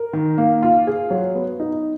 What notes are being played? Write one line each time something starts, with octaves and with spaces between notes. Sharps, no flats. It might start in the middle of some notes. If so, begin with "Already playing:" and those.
Already playing: A#4
D#3
A#3
F4
G#4
F#3
B3
D#4